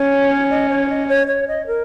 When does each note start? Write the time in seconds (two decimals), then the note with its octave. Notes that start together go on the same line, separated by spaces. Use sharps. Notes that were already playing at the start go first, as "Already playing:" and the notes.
Already playing: C#4 C#5
0.50 D#5
0.70 C#5
0.89 D#5
1.08 C#5
1.27 C#5
1.48 D#5
1.67 A#4